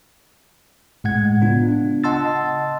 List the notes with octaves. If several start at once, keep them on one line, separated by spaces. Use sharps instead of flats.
A2 G#3 F#5 G#6
C#3 B3 D4 F4
D#5 F#5 A5 C6 E6 A6